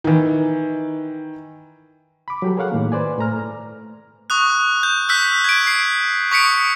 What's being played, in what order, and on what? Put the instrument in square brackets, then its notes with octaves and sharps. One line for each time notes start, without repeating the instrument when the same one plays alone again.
[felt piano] D#3 E3
[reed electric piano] B5 D6
F#3 G4 A4
G#4 A#4 C#5 F5 F#5
A2 D#3 A#3
B4 C5 D5 G#5
A2 A3 A#5 F6
[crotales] C#6 D#6 F#6
G6
E6 F#6 G6 B6
G#6 D7
C7
C#6 D#6 B6 C#7 D7